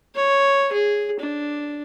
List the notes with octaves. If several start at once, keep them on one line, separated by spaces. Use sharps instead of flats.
C#5
G#4
D4